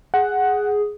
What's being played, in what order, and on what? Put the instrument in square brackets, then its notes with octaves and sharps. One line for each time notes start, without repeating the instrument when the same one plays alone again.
[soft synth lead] G#4 [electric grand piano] F#5